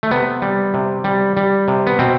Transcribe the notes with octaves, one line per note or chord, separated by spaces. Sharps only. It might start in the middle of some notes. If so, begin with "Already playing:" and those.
A3
C3 B3
G3
C3
G3
G3
C3
B3
B2 C4